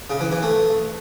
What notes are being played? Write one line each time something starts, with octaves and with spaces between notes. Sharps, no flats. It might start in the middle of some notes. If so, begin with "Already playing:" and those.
C#3
E3
E3
A3